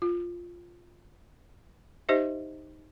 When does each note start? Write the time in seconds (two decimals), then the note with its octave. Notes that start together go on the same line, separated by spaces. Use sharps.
0.02 F4
2.09 D#4 G4 C5 D#5 E5